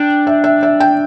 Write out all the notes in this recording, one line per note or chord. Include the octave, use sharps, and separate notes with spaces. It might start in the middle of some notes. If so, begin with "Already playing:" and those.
Already playing: D4 G5
E5
E5
E5
G5